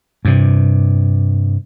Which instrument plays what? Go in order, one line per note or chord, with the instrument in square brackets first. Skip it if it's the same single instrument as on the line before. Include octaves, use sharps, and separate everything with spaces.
[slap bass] G2 C3